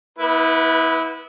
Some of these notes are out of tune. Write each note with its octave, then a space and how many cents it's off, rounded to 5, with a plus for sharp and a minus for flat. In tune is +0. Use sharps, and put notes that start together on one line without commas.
B3 -35 E4 -25 B4 +5